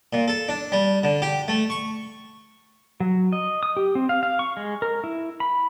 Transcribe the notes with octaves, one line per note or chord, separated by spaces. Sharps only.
A#2
A4
D4
G3
D3
G4
A3
C#6
F#3
D#5
D#6
G4
C4
F5
F5
C#6
G#3
A#4
E4
B5